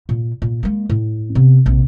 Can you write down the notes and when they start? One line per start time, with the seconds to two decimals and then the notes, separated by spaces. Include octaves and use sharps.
0.09 A#2
0.42 A#2
0.63 G#3 A#3
0.89 A2
1.35 C3 B3
1.66 A#1 C3